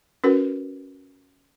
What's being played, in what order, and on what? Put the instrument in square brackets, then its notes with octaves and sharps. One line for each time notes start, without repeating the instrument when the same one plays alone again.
[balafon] C#4 F#4 A#4 B4